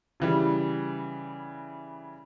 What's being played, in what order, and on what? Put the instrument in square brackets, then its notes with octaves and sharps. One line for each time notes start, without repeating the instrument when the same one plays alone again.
[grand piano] C#3 E3 G3